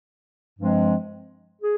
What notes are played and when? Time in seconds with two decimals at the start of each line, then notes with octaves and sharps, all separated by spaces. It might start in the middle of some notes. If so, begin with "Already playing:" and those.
0.59 G2 F3 G#3 C4
1.62 G#4